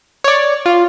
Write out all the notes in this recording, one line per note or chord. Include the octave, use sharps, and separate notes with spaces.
C#5 D5
F4